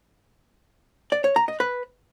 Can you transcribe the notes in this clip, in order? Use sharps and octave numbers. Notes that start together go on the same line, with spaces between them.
D5
C#5
A#5
D#5
B4